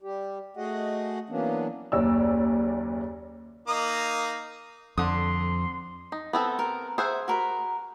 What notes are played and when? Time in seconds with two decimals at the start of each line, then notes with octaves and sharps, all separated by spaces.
0.02 G3 G4
0.57 A3 F#4 G#4 D#5 F#5
1.29 E3 F#3 A#3 B3 C#4 D4
1.92 F#1 D#2 C#5 D5 E6
3.68 A#3 D#4 D#6
4.98 F2 D3 C6 D#6
6.12 D#4
6.33 B3 C4 A4
6.59 A#4
6.98 G#4 C5 E5 F#5
7.28 F#4 A#4 B5